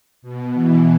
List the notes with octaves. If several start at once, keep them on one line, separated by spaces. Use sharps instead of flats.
B2
E3